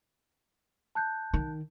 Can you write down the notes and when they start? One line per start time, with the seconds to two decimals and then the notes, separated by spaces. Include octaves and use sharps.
0.95 A5 F#6 G6
1.33 D#3